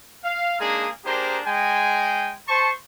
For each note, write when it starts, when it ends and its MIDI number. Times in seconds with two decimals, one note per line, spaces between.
0.24 0.58 77
0.59 0.87 56
0.59 0.87 58
0.59 0.87 62
0.59 0.87 63
0.59 0.87 68
1.05 1.39 58
1.05 1.39 62
1.05 1.39 67
1.05 1.39 68
1.05 1.39 70
1.05 1.39 72
1.46 2.33 56
1.46 2.33 79
1.46 2.33 80
2.48 2.70 72
2.48 2.70 81
2.48 2.70 85